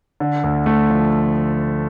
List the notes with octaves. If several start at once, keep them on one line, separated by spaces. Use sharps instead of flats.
D3
D2
A3
F3